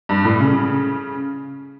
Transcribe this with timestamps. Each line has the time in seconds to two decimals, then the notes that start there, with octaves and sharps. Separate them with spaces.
0.09 G2
0.25 A2
0.40 C#3